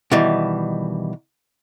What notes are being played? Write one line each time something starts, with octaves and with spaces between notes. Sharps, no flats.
B2 D#3 E3 G3